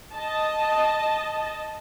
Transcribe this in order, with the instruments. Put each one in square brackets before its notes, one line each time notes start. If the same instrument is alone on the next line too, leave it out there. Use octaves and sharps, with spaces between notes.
[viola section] D#5 A5